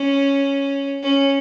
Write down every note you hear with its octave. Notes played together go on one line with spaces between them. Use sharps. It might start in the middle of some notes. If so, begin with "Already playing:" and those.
Already playing: C#4
C#4